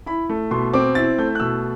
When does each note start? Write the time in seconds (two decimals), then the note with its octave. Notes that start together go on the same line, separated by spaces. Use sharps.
0.06 E4 B5
0.29 A3
0.51 B2 C6
0.74 C4 D6
0.95 E4 A6
1.19 A3 G6
1.35 F#6
1.40 B2 E6